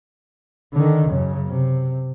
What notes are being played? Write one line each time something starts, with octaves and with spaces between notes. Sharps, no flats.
D3 D#3
F#2 C#3
C3